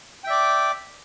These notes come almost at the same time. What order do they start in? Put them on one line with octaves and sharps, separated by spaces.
G5 E5 D5 D6